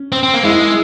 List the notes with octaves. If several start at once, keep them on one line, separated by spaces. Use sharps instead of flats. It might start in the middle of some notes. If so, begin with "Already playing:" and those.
Already playing: C#4
C4
C4
A#3
G#3 E4